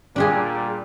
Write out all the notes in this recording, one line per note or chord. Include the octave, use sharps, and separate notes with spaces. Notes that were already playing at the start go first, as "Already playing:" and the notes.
A#2 G3 D4 G4 G#4